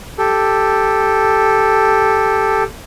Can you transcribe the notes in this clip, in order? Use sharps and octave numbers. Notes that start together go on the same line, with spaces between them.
G4 A4